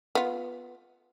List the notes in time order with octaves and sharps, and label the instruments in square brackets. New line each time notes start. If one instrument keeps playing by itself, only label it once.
[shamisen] B3 F4